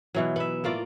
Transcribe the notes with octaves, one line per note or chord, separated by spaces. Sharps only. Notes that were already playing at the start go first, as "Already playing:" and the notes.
B2 E3 F#3
B3 E5
A2 A#3 F4 D5